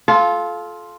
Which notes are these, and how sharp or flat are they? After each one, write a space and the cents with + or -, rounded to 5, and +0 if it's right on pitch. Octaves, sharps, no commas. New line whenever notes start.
F4 +0 A4 -30